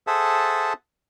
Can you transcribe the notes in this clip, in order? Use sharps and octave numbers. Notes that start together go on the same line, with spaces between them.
G#4 A4 C5 E5 F#5 A5